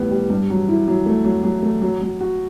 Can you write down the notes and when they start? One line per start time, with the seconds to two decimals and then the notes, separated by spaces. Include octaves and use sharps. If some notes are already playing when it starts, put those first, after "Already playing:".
Already playing: A2 G3 B3
0.11 G3
0.30 G2
0.50 F#3
0.68 E4
0.88 F#3
1.06 A3
1.25 F#3
1.44 F#3
1.63 A3
1.82 F#3
2.01 F#3
2.21 F#4